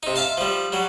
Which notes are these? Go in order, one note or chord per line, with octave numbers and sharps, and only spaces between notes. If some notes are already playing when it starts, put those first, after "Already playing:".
C3 D#4
E5 F5 A5 C6
F3 G3
F#3 G3